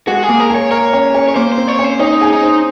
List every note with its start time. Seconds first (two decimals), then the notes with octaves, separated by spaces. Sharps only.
0.07 G#3 F#4
0.23 G#4
0.29 A#3
0.40 A#4
0.50 G#4
0.55 C#5
0.71 A#4 C#5
0.93 C#4
1.14 C#4
1.28 C#5
1.36 A#3 C5
1.52 C5
1.57 C4
1.68 C#5
1.79 C#4
1.84 C5
1.99 C#4 D#4
2.21 G#4
2.33 D#4
2.43 C5